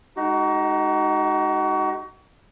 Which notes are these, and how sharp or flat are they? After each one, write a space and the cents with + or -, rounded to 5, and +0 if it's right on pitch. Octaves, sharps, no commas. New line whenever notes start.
G#3 +30 D#4 +0 F#4 +35